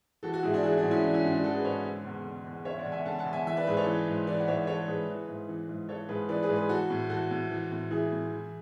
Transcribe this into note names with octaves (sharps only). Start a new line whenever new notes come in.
E3 F#4 A4
F#4 A4
G#2 E4 G#4
D4 F#4
E3 E4 G#4
D4 F#4
G#2
C#4 E4
E3 D4
C#4 E4
G#2 D4 F#4
D4 F#4
E3 F#4 A4
G#4 B4
G#2 A4 C#5
D3
E2
D3
E2
D3 C#5 E5
D5 F#5
E2
E5 G#5
D3 F#5 A5
F#5 A5
E2
E5 G#5
E3 E5 G#5
B4 D5
G#2 G#4 B4
A4 C#5
E3
G#2
E3 B4 D5
F#5
G#2 C#5 E5
E3 A4 C#5
G#2 G#4 B4
E3
G#2
E3
G#2
E3 A4 C#5
G#2 G#4 B4
E3 B4 D5
G#4 B4
G#2
G#4 B4
E3 F#4 A4
A2
E3 F#4 A4
A2
E3
A2
E3 E4 G#4
A2
E3